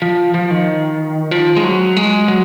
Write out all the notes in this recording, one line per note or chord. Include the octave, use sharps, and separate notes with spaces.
F3
F3
D#3
F3
G#3
F#3
G#3
F#3